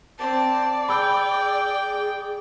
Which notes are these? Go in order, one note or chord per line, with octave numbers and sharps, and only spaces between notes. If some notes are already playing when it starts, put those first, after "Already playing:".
C4 D5 A5
G#4 G5 B5 E6 G6